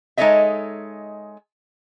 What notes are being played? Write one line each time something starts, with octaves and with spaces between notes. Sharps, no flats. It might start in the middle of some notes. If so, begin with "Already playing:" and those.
G#3 D#4 A4 C#5 D#5 E5